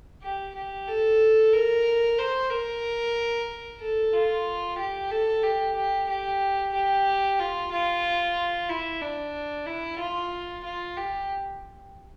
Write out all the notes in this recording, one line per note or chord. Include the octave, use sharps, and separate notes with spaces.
G4
G4
A4
A#4
C5
A#4
A4
F4
G4
A4
G4
G4
G4
G4
F4
F4
E4
D4
E4
F4
F4
G4